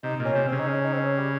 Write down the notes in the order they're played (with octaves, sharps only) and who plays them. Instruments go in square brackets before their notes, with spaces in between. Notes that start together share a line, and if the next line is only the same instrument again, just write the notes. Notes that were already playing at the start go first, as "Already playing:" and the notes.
[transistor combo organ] C3 [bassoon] D#4
[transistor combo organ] A#2
[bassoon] C#4
[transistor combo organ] C3
[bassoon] C4
[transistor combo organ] C#3
[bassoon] D#4
C#4
D#4
C4
C#4
G3